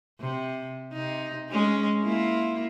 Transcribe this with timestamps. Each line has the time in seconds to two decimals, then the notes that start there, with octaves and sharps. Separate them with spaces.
0.20 C3
0.93 C3 D#4
1.50 G#3 C#4
2.03 A#3 E4 F4